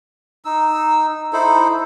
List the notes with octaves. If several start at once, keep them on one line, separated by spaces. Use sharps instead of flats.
D#4 E6
D#4 E4 A4 C5